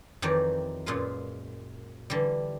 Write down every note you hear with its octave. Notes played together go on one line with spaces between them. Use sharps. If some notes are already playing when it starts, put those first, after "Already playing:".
F2 D#3 E3 F#3 G4 D5
F#2 A#2 G#3 F4 B4
D3 E3 G3